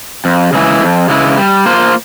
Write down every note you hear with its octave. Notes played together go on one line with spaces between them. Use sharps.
F2
C#3 E3 G#3 E4
F2
C#3 E3 G#3 E4
G3
A#3 F4 C5